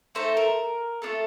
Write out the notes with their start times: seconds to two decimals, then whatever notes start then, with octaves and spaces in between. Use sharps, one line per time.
0.15 A3 D#4 A4 C5
0.37 A#4
1.02 A3 D4 F4 A4